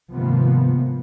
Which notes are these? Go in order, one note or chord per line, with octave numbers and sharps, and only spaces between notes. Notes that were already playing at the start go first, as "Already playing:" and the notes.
G#2 C3 D#3 F3 A#3 B3